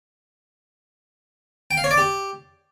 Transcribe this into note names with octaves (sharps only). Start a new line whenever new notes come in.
G5
F5
C#5
D5
G4